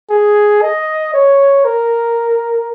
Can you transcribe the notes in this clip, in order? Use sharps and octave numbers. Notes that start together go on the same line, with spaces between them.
G#4
D#5
C#5
A#4